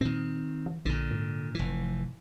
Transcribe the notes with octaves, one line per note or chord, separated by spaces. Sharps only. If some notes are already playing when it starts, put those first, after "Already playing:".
A#2 D#3 C4
E3
A#1 A#2 D3
G#2
F1 E3